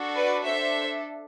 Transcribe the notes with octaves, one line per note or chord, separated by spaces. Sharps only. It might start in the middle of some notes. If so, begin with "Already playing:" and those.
Already playing: D4 F#4 A4
B4 D5
D4 A4 C5 E5